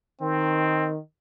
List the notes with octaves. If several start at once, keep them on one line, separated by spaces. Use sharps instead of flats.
D#3 C4